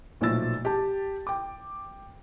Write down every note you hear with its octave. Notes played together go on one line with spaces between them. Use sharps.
B1 A#2 F3 A3 E6 A6
G4 A5
G5 D6